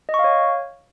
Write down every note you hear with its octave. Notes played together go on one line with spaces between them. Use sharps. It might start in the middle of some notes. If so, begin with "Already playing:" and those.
D#5
C#6
F5
C#5